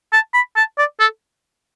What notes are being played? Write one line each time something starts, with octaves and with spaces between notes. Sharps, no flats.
A5
B5
A5
D5
A4